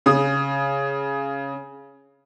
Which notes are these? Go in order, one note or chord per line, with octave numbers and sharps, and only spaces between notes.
C#3 D#6